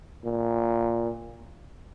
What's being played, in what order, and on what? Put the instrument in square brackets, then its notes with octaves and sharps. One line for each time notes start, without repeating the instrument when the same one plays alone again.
[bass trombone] A#2